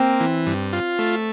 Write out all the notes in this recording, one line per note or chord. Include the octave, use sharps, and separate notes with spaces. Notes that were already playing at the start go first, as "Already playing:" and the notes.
Already playing: A#3 C4
E3
G2
F4
A3